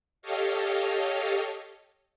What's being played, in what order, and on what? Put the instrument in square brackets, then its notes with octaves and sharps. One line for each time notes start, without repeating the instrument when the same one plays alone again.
[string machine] G4 A4 C#5 D#5 F5